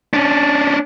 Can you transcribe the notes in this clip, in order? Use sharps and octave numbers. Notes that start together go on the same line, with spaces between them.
C#4 D4